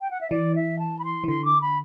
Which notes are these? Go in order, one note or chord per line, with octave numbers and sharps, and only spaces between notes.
G5
F#5
E5
E3 D5
E5
A5
B5
C6
E3
D3 C6
D6
B5